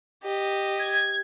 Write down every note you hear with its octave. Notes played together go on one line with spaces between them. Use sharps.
G4 D#5
G#6